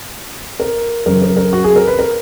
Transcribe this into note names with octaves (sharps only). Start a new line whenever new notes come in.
A#4
F#2 C#3 F#3 A#4
A#4
A#4
F#4
G#4
A#4
B4
A#4